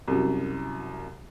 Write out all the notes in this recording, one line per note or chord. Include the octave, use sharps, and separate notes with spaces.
C2 F#2